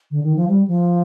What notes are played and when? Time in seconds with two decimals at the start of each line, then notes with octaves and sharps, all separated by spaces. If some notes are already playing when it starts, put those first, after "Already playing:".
0.11 D3
0.23 D#3
0.36 F3
0.48 G3
0.68 F3